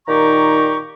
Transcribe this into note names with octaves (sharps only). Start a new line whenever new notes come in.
A#2 D#3 D#4 G4 A#5 C#6